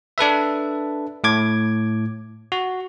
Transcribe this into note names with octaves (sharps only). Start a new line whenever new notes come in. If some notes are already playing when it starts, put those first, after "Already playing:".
D4 A4 B4 E5
A2 D6 G#6
F#4